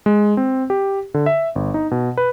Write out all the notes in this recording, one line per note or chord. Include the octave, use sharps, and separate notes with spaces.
G#3
C4
G4
D3
E5
G1
D#4
B2
B4